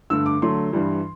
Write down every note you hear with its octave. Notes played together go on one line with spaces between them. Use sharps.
G2 D3 A3 E6
D6
D3 F#3 A3 C6
G2 E3 G3